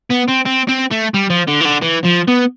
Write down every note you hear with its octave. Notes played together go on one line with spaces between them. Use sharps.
B3
C4
C4
C4
A3
G3
F3
D3
E3
D3
E3
F3
B3